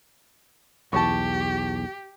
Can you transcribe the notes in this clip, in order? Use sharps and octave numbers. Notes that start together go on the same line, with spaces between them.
B1 E2 G4 A5 C#6